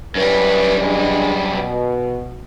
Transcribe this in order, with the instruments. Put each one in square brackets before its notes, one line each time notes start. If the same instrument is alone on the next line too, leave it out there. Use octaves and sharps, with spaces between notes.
[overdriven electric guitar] F#2 G3 [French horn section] C#4 E4 B4
[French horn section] E3 G#3 D4
B2